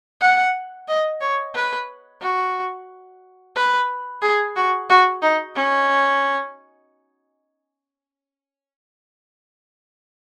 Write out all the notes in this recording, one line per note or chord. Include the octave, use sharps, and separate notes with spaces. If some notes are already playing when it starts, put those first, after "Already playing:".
F#5
D#5
C#5
B4
F#4
B4
G#4
F#4
F#4
D#4
C#4